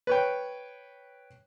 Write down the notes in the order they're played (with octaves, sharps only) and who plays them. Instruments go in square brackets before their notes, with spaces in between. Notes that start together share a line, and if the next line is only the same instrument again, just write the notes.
[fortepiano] B4 C#5 G5